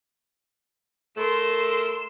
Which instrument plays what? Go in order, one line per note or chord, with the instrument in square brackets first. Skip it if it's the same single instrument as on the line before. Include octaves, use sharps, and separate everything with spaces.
[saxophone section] A3 A#4 [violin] C6 E7